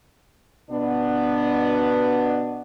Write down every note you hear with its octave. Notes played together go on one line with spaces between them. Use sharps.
B2 B3 D4